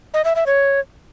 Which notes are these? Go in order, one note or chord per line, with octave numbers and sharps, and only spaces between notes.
D#5
E5
E5
C#5